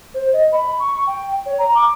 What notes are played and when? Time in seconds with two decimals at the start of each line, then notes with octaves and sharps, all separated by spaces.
0.14 C5
0.33 D#5
0.52 B5
0.79 C#6
1.07 G5
1.46 C#5
1.59 A#5
1.75 D6